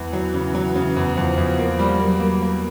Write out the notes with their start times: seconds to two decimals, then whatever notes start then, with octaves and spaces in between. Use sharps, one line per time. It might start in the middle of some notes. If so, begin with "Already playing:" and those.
Already playing: E2 E3
0.13 F#3
0.34 C#3
0.55 F#3
0.75 C#3
0.96 E2
1.16 E2 F3
1.37 E2
1.58 A#3
1.79 G3
2.00 F#3 A#3
2.20 A#3
2.42 A#3